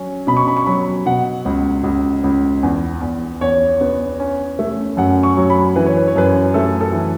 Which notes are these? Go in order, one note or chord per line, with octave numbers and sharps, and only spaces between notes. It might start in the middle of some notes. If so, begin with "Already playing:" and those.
Already playing: F#3 C#4
B2 B5
C#6
B5
C#6
F#3 B5
B2 F#5
C#2
C#2
C#2
E2
E2
E2 C#5
B3
C#4
A3
F#2 F#5
C#6
F#3
B5
E3 B4
C#5
B4
C#5
F#2 B4
A3 A4
A4
E3